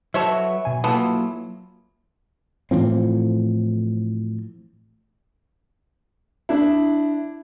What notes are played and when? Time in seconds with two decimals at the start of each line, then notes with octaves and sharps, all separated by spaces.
0.14 F#3 F#4 A4 B4 C#5 E5
0.65 B2 G#5
0.84 E3 F#3 A#3 B3 F4 A4
2.71 A2 E3 F3 C4
6.49 D4 E4